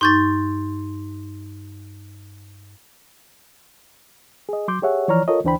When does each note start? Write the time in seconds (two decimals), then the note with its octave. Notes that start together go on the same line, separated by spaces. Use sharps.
0.01 G2 D#4 C6 C#6 G6 A6
4.49 G#4 D#5
4.68 F#3 C6 D6 G6
4.82 G4 G#4 C#5 E5 F#5
5.08 E3 F3 C#5 D5 A#5 F6
5.28 F4 A4 A#4 C#5 D#5
5.44 D2 E3 D4 C5 G5 B5